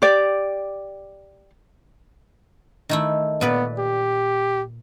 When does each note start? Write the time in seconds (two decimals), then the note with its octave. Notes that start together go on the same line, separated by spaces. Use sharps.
0.02 G4 D5
2.89 D#3 A3 E4
3.41 A#2 B3 B4 D5
3.78 G4